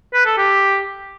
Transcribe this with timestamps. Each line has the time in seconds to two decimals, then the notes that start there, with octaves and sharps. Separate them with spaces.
0.14 B4
0.26 A4
0.38 G4